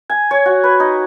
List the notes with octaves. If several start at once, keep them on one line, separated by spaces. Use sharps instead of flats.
G#5
C#5
F#4
B4
D#4